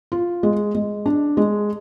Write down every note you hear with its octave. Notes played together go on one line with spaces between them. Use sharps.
F4
G#3
G#3
D4
G#3